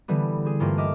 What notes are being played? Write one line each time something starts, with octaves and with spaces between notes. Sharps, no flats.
D3 E3 G3 B3
C4 G#4
G2 E3 A3 A#3 F4 C5
D#5 E5 D6 F6